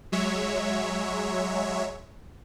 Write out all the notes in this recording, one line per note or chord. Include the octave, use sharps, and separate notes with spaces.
F#3 G#3 C#5 E5